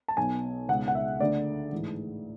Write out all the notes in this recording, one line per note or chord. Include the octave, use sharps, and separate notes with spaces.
A5
B1 B2 G#5
C#2 B2 F#5
F#5
E5
D2 D3 D5
A1 G#2 E3